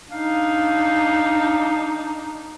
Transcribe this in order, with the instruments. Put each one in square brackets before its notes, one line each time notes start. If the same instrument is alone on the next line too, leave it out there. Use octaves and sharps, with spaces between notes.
[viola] D4 D#4 [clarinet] F5